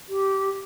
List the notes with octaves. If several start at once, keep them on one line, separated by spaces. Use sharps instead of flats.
G4